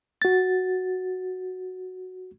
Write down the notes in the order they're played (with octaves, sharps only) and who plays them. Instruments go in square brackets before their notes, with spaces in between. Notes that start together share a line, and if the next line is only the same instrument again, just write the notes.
[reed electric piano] F#4 A6